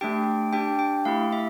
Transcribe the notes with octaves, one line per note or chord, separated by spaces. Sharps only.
A3 D4 G4 G5
D4 G4 G5
G5
A3 E4 G4 F5
E5